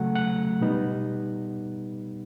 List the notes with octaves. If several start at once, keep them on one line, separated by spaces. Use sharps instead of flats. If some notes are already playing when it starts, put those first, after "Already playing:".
Already playing: C#3 F#3 A3 F#5
F#5
B2 G3 B3 D#4